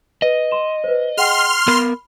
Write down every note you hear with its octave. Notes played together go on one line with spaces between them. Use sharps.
B4 D#5
C6 E7
B4 C5
G#4 F#5 G5 C6 F6
B3 A#4 B5